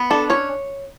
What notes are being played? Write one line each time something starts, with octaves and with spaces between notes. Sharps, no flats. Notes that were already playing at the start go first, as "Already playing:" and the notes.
Already playing: B3
D4 A4
C#4 C#5